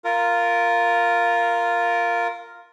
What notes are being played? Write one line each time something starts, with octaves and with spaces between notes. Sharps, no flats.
F4 A#4